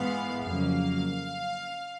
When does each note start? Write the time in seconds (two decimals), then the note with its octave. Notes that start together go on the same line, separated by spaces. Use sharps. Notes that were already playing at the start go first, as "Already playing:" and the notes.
Already playing: G#2 E3 G#3 B3 F5
0.44 F2 C#3 F#3 A#3 F5